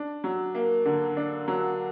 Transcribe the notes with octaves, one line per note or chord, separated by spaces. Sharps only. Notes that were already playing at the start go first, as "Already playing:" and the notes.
Already playing: D4
F#3
A#3
D3
D4
F#3